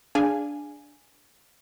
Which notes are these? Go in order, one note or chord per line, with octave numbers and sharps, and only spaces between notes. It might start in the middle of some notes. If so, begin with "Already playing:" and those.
D4 G#4 F5 G#5